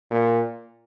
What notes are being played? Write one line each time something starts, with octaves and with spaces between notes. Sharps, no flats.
A#2